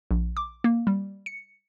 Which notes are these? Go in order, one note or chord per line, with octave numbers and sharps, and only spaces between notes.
A#1
D6
A#3
G3
C#7